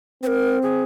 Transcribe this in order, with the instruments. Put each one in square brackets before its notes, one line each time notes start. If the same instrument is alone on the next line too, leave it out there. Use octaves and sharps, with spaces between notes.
[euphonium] C4 [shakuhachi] C5
[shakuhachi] A#4
G#4